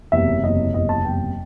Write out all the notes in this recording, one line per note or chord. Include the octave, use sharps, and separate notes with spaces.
F#1 E2 C3 E5
F#1 E2 C3 D#5
F#1 E2 C3 D#5
A5
F#1 E2 C3 G5